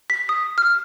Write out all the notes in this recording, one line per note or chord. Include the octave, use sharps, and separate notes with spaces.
B6
D#6
F6